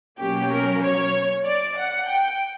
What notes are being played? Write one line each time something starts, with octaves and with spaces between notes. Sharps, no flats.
B2 F#3 A#3 C#4 G4
A#4
C#5
D5
F#5
G5